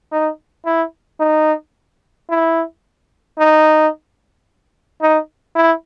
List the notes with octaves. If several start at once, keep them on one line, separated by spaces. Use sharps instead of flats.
D#4
E4
D#4
E4
D#4
D#4
E4